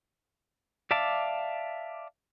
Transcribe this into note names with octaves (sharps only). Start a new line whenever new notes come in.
D5 E5 F5 A5 D6